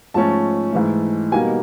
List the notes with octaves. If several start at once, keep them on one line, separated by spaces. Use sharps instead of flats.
G#2 F3 A3 C#4 A5
G#2 E3 A3
B2 G3 A#3 D#4 G#5